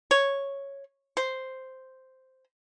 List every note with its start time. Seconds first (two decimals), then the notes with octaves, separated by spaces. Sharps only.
0.11 C#5
1.17 C5